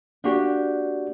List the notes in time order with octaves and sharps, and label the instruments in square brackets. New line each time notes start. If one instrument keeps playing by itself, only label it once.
[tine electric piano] A#3 F#4 [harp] D4 G4